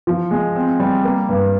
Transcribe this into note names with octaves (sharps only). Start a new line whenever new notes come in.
F3
G#3
C4
G3
A#3
G2